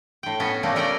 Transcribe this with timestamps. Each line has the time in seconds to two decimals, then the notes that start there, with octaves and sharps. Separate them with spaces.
0.23 A2 G5
0.40 B3 C#4 F#4
0.63 C#3 G3 A3 A#3
0.75 A3 C#4 A#4 D5 G5 A#5